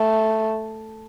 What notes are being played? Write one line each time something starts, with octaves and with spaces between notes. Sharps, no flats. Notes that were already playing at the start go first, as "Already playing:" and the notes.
Already playing: A3